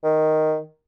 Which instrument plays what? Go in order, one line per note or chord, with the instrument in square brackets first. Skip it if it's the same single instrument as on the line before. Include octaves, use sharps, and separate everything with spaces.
[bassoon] D#3